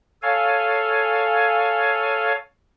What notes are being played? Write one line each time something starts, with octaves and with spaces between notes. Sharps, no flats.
A4 C#5 F5 G#5